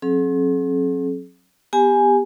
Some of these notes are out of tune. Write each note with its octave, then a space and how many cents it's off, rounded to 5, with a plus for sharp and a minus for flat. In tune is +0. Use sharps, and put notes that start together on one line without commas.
F#3 -25 C4 +40 G#4 +45
B3 +0 G4 +20 G#5 +5